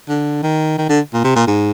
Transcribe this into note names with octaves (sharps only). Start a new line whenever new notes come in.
D3
D#3
D#3
D3
A#2
C3
A#2
G#2